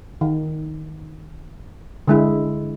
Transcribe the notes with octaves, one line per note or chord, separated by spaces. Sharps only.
D#3
D3 G#3 E4